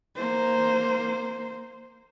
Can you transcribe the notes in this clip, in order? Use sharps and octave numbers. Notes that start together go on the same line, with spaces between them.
A#3 C5